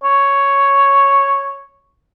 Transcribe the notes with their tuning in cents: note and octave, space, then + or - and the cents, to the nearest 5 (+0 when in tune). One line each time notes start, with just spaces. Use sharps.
C#5 +0